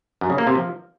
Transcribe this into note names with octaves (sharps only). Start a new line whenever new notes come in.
F#2
C#3
A#3
C3
F3